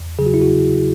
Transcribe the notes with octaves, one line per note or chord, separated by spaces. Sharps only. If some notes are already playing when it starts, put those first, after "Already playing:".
Already playing: E2
C#3 F#3 G#4
F#4
E4
F#4